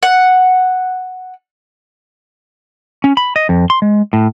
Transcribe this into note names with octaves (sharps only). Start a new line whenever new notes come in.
F#5
C#4
B5
D#5
F2
C6
G#3
A2